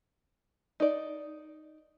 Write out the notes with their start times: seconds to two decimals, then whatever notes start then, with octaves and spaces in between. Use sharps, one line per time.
0.80 D#4 D5